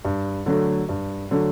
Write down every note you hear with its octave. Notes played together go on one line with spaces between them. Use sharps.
G2
D3 F#3 A3
G2
D3 F#3 A3